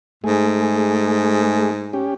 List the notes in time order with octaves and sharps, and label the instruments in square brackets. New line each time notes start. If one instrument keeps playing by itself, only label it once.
[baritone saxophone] G#2 [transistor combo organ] A3 G#4
[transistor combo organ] C#4 G4